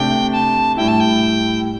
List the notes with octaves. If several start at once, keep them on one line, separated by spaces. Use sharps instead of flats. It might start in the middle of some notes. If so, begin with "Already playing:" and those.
Already playing: C3 A3 D4 G5
A5
A2 G3 E4 G5
A5
G5